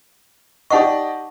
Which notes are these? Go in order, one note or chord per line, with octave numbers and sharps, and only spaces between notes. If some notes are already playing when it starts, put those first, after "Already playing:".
D#4 G4 D5 D#5 F#5 C#6